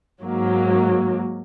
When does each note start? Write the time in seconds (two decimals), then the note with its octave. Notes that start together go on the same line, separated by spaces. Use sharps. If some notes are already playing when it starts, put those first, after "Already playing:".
0.22 G#2 F#3 A#3